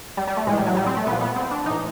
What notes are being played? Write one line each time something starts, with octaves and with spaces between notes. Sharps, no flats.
G3
G3
A3
A2 E3 G#3
G3
F#3
G3
C4
A3
A#2 F3 B3
B3
C4
D4
A2 E3 D#4